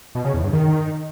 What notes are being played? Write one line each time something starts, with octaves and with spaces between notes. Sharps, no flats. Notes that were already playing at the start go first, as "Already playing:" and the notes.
B2
C#3
E2
G2
D#3